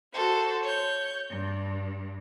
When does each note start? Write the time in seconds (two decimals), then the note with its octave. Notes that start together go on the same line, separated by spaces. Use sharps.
0.12 F#4 A4 C5
0.64 C#5 G6
1.29 G2